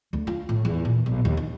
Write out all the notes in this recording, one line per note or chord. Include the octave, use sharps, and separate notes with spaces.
D2
F4
A2
E2
A#2
B1
D#2
D#4